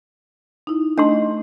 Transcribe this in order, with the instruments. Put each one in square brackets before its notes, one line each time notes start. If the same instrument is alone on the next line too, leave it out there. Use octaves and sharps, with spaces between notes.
[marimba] D#4 E4
[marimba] A3 D#5 [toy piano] D4 C6